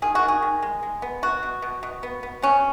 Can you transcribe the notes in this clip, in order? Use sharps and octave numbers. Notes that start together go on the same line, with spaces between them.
D#3 G#4
F#4
D#3
G#4
D#3
G#3
G#3
B3
B2 F#4
B2
B2
B2
B3
B3
B2 C#4